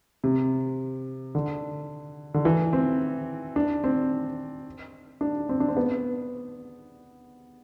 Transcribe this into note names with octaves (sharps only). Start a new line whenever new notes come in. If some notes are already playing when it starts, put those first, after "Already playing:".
C3
D3
D3
E3
C4
D4
C4
D4
C4
D4
C4
B3